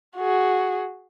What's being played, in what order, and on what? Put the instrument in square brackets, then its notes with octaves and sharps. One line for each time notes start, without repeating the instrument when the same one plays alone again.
[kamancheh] F#4 G#4